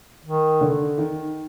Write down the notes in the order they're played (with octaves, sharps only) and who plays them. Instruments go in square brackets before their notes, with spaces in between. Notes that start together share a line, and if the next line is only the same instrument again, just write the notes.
[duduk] D#3
[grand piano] D3
D#3